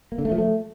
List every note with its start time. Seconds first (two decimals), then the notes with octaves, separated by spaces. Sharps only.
0.12 A#3
0.18 D3
0.25 A3
0.32 F3
0.38 A3